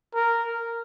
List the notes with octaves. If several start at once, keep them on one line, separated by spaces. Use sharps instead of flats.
A#4